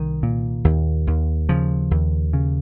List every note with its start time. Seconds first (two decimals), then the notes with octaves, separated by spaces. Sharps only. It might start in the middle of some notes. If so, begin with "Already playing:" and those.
Already playing: C2 D#3
0.23 A#2
0.65 D#2
1.07 D#2
1.49 C#3 F3
1.91 D#2
2.33 C#3